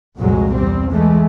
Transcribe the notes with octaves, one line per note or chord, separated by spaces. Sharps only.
C2 F2 A#2 F#3 G#3
E2 G3 C4
E3 G#3 A3